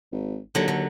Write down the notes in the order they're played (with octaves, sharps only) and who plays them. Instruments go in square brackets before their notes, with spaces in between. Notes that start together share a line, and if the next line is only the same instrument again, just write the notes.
[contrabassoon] G#1
[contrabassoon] D#2 [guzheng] D3 F#3
[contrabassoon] D#2 [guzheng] D3